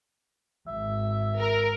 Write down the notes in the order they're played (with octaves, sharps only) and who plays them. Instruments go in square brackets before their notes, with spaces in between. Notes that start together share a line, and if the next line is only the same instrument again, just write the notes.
[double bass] G#1 [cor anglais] E5
[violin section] A#4